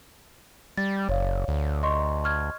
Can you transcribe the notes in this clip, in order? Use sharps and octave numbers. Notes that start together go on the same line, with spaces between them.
G3 A6
F#1 C#5 D5 F5
D2
D#5 C6 C#6
C#6 F6 G#6